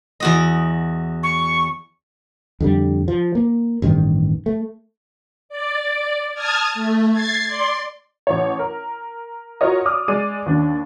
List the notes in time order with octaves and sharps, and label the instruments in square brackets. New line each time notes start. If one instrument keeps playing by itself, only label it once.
[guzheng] E2 F#4 D#5
[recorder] C#6
[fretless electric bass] F2 D3 G3
F3
A#3
A1 G2 D#3
A3
[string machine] D5
A5 D#6 F6 G#6
A3
G#6 A6 C7
D5 C6
[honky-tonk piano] A1 C#5
A#4
F4 F#4 A#4 C#5 D#5
D5 D6 D#6 F6
G#3 D5 D#7
D#2 D4